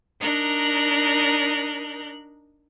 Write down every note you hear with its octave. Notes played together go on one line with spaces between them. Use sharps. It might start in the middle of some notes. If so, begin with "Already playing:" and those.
D4 D#4 A#4 F#6